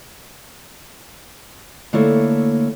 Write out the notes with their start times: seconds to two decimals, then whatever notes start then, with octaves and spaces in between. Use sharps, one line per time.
1.93 D3 A3 A#3 E4 C#5